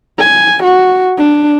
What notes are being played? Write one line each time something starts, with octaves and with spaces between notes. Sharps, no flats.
G#5
F#4
D4